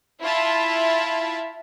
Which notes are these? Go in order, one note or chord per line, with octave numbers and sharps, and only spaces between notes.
E4 F4 E5 A5